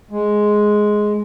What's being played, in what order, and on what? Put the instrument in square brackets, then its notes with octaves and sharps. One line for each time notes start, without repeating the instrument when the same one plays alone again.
[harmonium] G#3